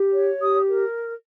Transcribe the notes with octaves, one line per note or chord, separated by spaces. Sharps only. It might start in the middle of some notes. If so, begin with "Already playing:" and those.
Already playing: G4
C#5
G4 D#6
A#4